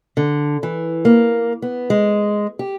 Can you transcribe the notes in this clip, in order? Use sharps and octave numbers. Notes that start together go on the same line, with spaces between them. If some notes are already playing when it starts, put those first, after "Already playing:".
D3
E3
A#3
B3
G#3
G4